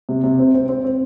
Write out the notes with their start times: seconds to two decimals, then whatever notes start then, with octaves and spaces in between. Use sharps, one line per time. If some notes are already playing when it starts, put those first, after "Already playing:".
0.09 C3
0.24 C3
0.39 C4
0.54 C4
0.69 C4
0.85 C4